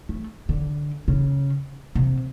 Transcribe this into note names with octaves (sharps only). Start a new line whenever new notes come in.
A3
D3
C#3
C3